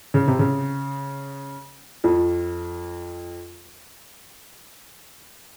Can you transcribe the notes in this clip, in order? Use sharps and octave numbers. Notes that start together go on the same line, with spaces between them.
C#3
C3
C#3
F2 F3